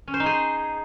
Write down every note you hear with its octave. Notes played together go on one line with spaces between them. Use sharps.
C#4
C5
D#4
G#4